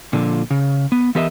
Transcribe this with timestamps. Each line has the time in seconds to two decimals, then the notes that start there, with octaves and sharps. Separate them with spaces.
0.13 A#2 D3 F3
0.51 C#3
0.92 B3
1.15 E3 B3 G4 A#4 D#5 E5